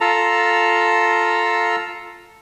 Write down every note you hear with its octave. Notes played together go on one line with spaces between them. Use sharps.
F4 A4 A5 A#5